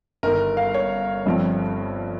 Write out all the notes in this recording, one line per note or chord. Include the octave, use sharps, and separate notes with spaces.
G1 G2 D#3 A#4
F5
C#5
G1 G2 F3 C4